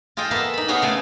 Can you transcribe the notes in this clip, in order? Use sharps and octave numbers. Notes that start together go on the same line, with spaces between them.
F4 G#4 A4 D#5 G5
A#3 B3 A4 A#4 E5 A5
D#4 B5
B3 F#4 G#4 C#5 F5
C#3 A3 G#5 A5